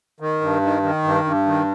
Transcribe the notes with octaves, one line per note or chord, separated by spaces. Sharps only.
D#3
G2
D#3
D#3
G2
G2
D#3